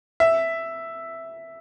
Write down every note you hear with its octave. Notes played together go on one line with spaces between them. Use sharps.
E5